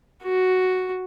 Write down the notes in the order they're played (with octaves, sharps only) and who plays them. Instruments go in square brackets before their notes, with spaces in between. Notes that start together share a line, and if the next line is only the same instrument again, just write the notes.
[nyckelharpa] F#4